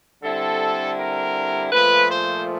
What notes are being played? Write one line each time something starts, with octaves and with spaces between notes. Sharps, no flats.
D3 G3 C4 E4 A4
A#4
A#2 F3 A3 B4
C5